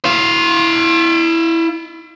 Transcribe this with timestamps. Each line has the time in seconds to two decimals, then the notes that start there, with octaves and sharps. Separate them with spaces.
0.05 E4 F5